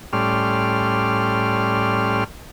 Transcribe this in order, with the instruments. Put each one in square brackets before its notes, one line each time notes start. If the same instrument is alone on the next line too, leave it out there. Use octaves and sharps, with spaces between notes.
[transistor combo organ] A2 G3 C#4 D5 C6 F6